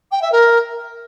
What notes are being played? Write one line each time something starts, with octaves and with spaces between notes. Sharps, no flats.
G5
E5
A#4